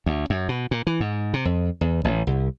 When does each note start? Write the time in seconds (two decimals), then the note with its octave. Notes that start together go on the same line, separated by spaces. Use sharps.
0.06 D2
0.30 F#2
0.49 B2
0.71 A#2
0.87 E3
1.00 G#2
1.34 C3
1.45 F2
1.81 E2
2.05 A1
2.27 C2